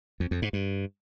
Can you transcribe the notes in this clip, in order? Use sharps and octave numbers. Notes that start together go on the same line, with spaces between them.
F2
F2
G#2
G2